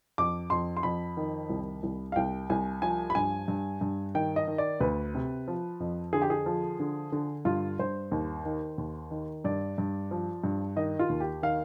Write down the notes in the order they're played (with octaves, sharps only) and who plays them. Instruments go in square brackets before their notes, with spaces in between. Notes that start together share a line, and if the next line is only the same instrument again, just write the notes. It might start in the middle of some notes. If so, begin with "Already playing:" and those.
[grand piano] F2 D6
F2 C6
C6
F2 B5
D#3
C2
C2
F5
C2 G5
C2 G#5
F3 G#5
B5
G2 G#5
G2
G2
D#3 G5
D#5
D#3
D5
D2 B4
C3
F3
F2
D3 G#4
G4
G#4
F3
D3
D3
G2 F4
G2 C5
D#2
D#3
D#2
D#3
G2 D5
G2
F3
G2
D#3 D#5
F4
D#2
G4
D#3 F5